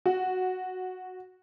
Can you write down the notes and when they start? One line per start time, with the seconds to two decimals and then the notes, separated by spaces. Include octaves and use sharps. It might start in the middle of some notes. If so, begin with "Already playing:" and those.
0.06 F#4